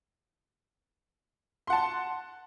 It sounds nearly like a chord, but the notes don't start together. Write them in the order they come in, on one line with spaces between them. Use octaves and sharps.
C6 F#5 A5